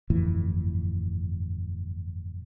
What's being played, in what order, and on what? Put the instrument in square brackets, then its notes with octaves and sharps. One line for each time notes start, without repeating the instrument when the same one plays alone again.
[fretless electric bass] G1 F2 A2 E3